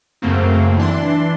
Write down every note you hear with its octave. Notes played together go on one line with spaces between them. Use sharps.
F#2 C#3 F#3 A3 A#3 C4
E3 D4 C6